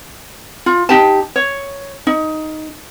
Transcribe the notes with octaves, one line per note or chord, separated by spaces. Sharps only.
F4
D#4 G4 A5
C#5
D#4